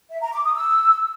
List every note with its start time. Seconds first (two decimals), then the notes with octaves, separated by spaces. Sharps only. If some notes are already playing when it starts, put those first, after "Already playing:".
0.11 E5
0.22 A#5
0.33 D6
0.44 D#6
0.56 E6